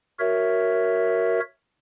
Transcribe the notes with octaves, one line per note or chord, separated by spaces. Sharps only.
F#4 A#4 C#5 E5